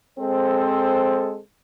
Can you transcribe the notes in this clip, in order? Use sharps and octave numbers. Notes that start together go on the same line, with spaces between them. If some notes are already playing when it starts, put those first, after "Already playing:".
G#3 C4 A4 C5